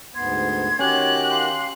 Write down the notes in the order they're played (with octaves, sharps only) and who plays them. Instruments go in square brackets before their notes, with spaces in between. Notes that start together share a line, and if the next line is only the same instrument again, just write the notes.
[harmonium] D2 G#2 B3 [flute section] C6 G#6
[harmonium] D#3 F#4 [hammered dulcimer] C#4 [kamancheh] G4 F#6
[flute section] F5 C6